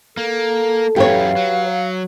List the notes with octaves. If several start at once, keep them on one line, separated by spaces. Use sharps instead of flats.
A#3 A4
F#2 E3 G4 B4 C#5 F5
F#3